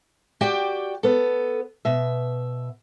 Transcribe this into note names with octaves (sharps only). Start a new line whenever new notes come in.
F#4 G4 D5 G5
B3 A4
B2 E5